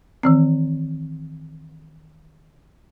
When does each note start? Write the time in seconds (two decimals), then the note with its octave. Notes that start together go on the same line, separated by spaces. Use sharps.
0.23 D#3 E3 C4